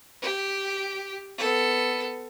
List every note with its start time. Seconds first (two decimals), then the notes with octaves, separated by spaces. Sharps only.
0.22 G4
1.39 B3 A4